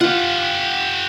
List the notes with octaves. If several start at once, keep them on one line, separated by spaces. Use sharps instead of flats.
F4 G4 F#5